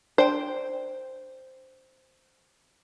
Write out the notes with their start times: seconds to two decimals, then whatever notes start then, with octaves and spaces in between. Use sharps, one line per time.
0.18 D4 C5 G5